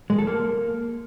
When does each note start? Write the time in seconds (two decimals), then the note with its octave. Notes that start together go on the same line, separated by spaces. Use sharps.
0.10 G#3
0.18 A4
0.27 A#3